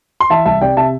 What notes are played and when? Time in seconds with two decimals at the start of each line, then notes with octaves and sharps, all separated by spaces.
0.20 C6
0.30 E3 E5 A5
0.45 C2 E5 A5
0.61 C3 D5 G5
0.77 C3 E5 A5